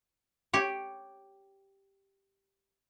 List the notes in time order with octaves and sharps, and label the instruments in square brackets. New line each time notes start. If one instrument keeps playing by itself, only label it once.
[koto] G4 C#5